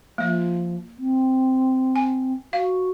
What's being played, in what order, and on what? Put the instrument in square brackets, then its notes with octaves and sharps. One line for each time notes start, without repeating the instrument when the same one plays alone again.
[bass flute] F3 [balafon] A#3 E5
[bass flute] C4
[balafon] G#5
[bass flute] F#4 [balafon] F5